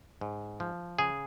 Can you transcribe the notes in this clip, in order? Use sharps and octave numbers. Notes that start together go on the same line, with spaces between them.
G#2
F3
C#3 G#4